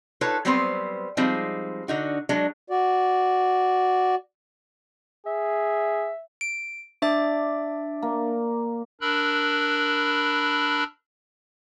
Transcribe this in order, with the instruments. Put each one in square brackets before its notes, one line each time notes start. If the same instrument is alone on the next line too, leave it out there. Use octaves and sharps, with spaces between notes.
[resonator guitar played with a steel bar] D#4 F4 A4 B4 C#5
F#3 G3 B3 C4 B4 C5
F3 G3 G#3 C4 D#4
D3 D#4 F#4
F#3 G#3 D4
[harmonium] F#4 D5
[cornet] G#4 [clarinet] E5
[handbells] D7
[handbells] D4 E5 A6 [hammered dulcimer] D5
[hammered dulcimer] A#3
[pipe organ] D4 A#4 B5 E6 F#6